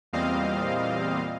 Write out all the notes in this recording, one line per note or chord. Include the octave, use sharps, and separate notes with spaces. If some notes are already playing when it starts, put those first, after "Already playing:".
E2 A#2 G3 C4 D#5 F5